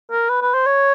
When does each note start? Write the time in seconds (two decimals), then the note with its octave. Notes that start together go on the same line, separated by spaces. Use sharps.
0.11 A#4
0.30 B4
0.42 B4
0.54 C5
0.67 C#5